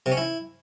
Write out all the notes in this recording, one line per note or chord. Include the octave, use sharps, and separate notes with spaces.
C3
C#4
E4